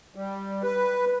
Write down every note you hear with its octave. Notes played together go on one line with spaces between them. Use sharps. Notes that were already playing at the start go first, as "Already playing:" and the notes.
G3
B4